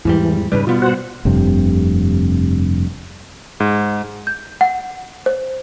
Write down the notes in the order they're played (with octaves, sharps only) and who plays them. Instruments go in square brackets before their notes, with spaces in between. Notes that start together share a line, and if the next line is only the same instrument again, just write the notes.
[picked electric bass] E2 G#2 G3 [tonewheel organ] E3
[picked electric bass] G#2 C#3 G3 [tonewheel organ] B4
[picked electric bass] B2 G3 B3 [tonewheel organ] F4
[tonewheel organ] F#4 C5 F#5
[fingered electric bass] F1 G2 C3
[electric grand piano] G#2
[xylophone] G6
F#5
C5